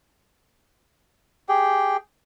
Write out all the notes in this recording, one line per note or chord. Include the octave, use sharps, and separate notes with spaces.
G4 G#4 G5